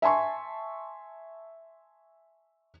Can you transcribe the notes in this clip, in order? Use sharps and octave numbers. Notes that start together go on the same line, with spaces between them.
E5 G#5 A5 C6 C#6